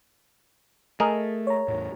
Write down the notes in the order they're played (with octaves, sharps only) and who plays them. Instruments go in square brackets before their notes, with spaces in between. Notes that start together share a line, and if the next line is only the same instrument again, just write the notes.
[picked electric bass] A3 [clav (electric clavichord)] G#4 A#4 D#5
[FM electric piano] C#5 A#5
[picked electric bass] E2 A2